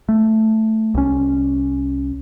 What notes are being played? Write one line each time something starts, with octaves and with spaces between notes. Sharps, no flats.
A3
C2 C#4